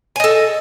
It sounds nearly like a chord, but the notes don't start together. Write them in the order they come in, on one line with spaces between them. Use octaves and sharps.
G#5 D#5 A4